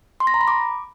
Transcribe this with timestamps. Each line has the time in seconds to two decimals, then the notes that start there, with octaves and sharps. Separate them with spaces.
0.20 C6
0.27 A#6
0.34 A#5
0.41 B5
0.48 D6